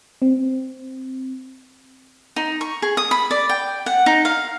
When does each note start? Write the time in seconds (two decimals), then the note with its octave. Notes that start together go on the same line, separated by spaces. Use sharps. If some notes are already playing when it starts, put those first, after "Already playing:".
0.22 C4
2.36 D#4
2.61 C#6
2.82 G#4
2.97 D#6
3.11 B5
3.31 D5
3.49 G5
3.86 F#5
4.06 D#4
4.25 F5